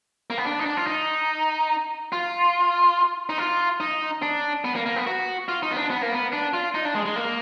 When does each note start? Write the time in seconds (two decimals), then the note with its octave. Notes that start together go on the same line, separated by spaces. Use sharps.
0.30 A#3
0.38 B3
0.45 D4
0.60 D#4
0.66 D4
0.77 F4
0.87 D#4
2.12 F4
3.29 D#4
3.38 F4
3.80 D#4
4.22 D4
4.65 B3
4.76 A#3
4.86 A#3
4.96 B3
5.07 F#4
5.48 F4
5.63 D#4
5.71 B3
5.76 D4
5.91 B3
6.02 A#3
6.12 B3
6.33 D4
6.53 F4
6.75 D#4
6.85 D4
6.95 G#3
7.06 G#3
7.16 A#3